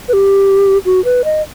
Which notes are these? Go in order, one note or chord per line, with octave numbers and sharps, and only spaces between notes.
B4
G4
F#4
B4
D#5